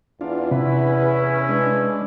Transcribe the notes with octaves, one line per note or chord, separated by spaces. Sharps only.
E2 D4 F4
C3 C#4 E4 B4
G#3 D4 B4